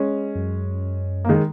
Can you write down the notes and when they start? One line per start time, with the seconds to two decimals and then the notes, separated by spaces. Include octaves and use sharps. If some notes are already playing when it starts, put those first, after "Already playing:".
Already playing: G#3 C#4
0.35 F#2
1.25 A#3
1.29 D#3 G#3